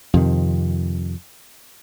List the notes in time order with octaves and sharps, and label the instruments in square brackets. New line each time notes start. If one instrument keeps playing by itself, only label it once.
[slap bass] F2 C3 D#3